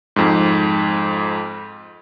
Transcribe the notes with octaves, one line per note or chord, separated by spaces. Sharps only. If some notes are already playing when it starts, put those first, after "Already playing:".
F2 G#2